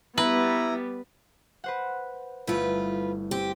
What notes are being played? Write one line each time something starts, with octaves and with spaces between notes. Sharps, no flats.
G3 B3 E4 B4 A#5
B4 C5 F#5
G1 A3 E4 F4 B4
C4 G4